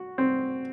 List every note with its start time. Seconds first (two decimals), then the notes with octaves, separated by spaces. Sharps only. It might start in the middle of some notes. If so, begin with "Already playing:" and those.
Already playing: F#4
0.18 C4